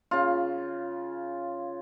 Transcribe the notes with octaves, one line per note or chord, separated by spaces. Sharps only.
C#3 F4